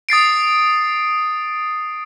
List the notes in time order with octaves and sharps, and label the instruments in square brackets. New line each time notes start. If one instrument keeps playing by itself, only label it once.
[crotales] D#6 A6 C7 D7